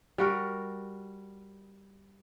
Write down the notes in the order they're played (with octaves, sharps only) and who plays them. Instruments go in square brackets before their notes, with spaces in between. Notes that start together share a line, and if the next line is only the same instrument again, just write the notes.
[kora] G3 F#4 A#4